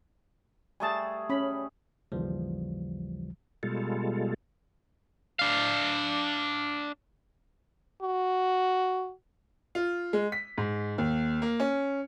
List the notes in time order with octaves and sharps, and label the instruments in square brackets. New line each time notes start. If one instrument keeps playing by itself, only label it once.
[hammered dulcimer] G3 A3 G#4 [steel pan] G#5 A5
[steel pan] C#4 B5
[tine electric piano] G#1 D#2 C#3 E3 F3 G3
[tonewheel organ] B2 G3 G#3 F4 A4
[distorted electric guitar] D4 F5
[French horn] F#4
[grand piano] F4
G#3
B6
G#2
D#2
A#3
C#4